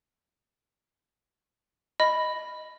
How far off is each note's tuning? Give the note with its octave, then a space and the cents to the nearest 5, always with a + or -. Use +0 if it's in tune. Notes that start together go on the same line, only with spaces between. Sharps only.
D#5 +0 B5 +0